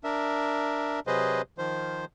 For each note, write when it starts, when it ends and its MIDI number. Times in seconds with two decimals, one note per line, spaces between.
0.04 1.00 62
0.04 1.00 70
0.04 1.00 76
1.07 1.42 48
1.07 1.42 54
1.07 1.42 68
1.07 1.42 71
1.07 1.42 72
1.07 1.42 75
1.58 2.05 51
1.58 2.05 53
1.58 2.05 72